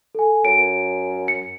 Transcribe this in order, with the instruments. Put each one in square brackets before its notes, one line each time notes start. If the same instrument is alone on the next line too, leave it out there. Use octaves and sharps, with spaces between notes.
[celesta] A4 G#5
[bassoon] F#2 [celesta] D7
[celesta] C#7